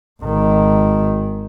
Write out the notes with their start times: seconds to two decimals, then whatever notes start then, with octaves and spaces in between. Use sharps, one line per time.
0.23 G#1 D#3